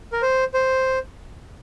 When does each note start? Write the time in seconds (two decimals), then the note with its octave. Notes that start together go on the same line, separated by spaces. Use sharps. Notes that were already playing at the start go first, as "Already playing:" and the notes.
0.12 A#4
0.22 C5
0.54 C5